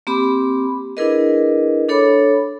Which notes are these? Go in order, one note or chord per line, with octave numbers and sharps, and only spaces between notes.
A#3 C4 G4 B5 D6
D4 E4 G#4 A#4 B4 D#5
D4 A4 C#5 B5 D6